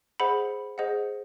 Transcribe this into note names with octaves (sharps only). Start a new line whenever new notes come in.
G#4 C5 D#5 F#5 B5
G#4 C5 D#5 F#5